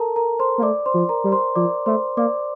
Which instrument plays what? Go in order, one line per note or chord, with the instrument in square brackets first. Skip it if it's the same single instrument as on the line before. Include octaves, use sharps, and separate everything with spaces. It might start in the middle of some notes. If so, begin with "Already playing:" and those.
Already playing: [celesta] A4 A#4 A5 A#5
A#4 A#5
C5 C6
[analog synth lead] A#3
[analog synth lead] A3 [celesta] D5 D6
[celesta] C5 C6
[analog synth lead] F3
[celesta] A#4 A#5
[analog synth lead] G3
[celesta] C5 C6
[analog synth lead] F3 [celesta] D5 D6
[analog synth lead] A3 [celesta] C5 C6
[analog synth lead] A#3 [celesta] D5 D6